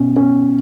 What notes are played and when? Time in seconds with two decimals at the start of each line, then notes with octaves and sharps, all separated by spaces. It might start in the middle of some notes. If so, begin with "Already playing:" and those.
Already playing: B2 C#4
0.16 C#4